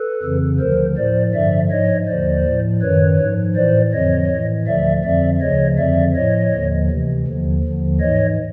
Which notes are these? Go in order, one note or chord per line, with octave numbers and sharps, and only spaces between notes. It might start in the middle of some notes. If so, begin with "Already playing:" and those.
Already playing: A4 B4
F2 C#3 E3
D2 D3 F3 A#4 C5
A2 F3 C5 D5
G2 D3 F3 D5 E5
G#2 F3 C#5 D#5
D#2 D3 F3 C5 D5
A2 F3
F#2 D#3 B4 C#5
G#2 F3
A2 E3 C5 D5
F2 D3 F3 C#5 D#5
A2 E3
D2 D3 F3 D5 E5
F2 D3 F3 D5 E5
D2 C#3 F3 C#5 D#5
F2 D3 F3 D5 E5
A2 F3 C#5 D#5
D#2 D3 F3
D2 C3 E3
D#2 D3 F3
D#2 D3 F3
G#2 E3 C#5 D#5